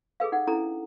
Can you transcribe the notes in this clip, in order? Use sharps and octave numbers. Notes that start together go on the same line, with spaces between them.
G#4 A4 B4 F5
D#4 F#5
C#4 D4 E4 A4 A#5